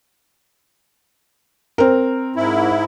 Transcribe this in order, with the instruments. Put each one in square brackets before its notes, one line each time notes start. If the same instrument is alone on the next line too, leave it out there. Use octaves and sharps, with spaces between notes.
[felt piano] C4 A#4
[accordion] G#2 E4